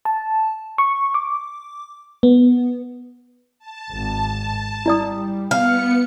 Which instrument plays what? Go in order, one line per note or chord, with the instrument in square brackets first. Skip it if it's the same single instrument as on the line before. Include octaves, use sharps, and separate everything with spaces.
[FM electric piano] A5
C#6
D6
B3
[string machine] A5
[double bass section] G#1
[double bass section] G3 [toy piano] E4 D5 D#6
[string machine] B3 C#7 [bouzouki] F5